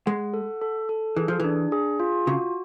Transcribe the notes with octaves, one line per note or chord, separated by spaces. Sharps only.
G#3 F#5
A4
A4
A4
E3 G#4
F3
E3 D4
G#4
F4
C#3 F#4